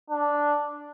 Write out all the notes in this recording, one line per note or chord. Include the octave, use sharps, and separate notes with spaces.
D4